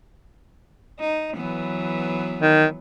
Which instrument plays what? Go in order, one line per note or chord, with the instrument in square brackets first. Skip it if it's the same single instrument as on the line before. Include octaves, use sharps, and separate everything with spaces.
[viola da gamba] D#4
E3 F#3 B3
[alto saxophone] D#3